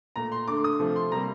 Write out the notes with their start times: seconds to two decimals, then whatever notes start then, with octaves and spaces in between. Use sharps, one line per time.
0.16 A#2 A3 A#5
0.32 C6
0.48 D3 A3 D6
0.64 D#6
0.80 C3 F3 A3
0.96 C6
1.12 C3 G3 A#3 A#5